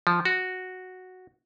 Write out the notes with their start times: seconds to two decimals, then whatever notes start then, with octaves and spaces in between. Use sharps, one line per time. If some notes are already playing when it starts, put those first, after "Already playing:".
0.07 F3
0.25 F#4